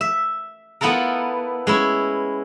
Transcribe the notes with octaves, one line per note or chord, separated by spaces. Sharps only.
E5
B3 E4 F4 A4 A#4
G#3 C#4 E4